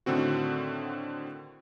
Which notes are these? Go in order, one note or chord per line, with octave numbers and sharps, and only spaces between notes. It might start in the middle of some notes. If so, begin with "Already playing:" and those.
A2 D3 D#3 C4 F#4